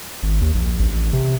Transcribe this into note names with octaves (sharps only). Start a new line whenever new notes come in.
G#1
D#2
A#1
A1
C3